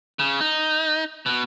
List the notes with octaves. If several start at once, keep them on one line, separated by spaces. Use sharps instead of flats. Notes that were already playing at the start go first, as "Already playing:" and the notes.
C#3
D#4
B2